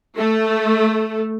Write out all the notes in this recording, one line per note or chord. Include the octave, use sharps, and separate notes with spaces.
A3